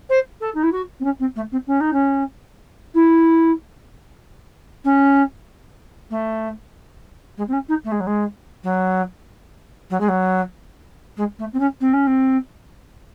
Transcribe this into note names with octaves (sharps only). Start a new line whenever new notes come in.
C5
A4
D#4
E4
F#4
C4
C#4
C4
A3
C4
C#4
D#4
C#4
E4
C#4
A3
G#3
C4
C#4
D#4
A3
G#3
F#3
G#3
F#3
F#3
G#3
F#3
G#3
A3
C4
C#4
C4
C#4
C4